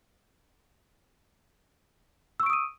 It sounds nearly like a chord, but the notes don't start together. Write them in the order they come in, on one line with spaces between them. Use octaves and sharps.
E6 C#6 D7 D#6 D#7